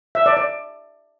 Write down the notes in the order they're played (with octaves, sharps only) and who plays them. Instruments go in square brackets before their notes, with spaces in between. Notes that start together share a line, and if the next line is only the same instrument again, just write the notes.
[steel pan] E5
D5
D5